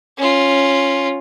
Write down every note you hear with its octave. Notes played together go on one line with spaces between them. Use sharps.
C#4 F4